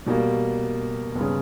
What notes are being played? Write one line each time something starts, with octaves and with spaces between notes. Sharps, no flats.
B2 G3 A#3
G1
C#3